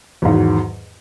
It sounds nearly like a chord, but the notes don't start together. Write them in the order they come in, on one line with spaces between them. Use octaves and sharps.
E2 G#2 D#3 F#3